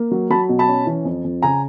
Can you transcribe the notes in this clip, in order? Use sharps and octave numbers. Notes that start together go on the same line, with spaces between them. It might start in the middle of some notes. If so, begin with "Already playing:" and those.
Already playing: A#3
F#3
F#3 A5 B5
B2
A5 B5
C#4
E3
F2
F2
C#3 G#5 A#5